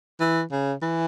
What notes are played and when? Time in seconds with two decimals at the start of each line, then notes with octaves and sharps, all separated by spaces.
0.20 E3
0.51 C#3
0.82 E3